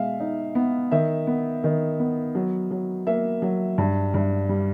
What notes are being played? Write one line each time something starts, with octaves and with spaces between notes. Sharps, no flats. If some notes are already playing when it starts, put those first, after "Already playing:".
Already playing: B2 G#3 E5 F5
D#4
B3
D#3 E5
B3
D#3
B3
F#3
F#3
A#3 E5
F#3
G2
G2
G3